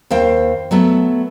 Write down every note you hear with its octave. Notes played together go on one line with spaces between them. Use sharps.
D#2 C5 F5 G5
F#3 A3 B3